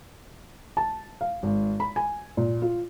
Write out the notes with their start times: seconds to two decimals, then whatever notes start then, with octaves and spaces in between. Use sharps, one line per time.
0.77 A5
1.21 F5
1.43 G#1
1.80 B5
1.96 G#5
2.37 A#2
2.62 F4